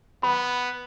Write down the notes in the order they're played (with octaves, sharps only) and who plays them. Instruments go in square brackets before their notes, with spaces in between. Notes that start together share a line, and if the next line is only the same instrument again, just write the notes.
[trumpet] B3 [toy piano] B5